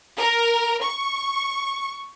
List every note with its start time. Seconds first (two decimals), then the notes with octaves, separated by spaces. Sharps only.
0.18 A#4
0.82 C#6